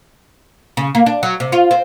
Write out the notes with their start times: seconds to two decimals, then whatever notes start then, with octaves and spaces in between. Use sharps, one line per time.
0.77 C#3
0.95 A#3
1.06 D4
1.23 F#3
1.40 C3
1.52 F4
1.71 C4